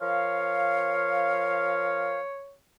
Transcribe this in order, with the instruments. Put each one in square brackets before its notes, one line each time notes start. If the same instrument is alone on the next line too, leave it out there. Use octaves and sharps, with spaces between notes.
[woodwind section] F3 A#4 F5 [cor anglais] C#5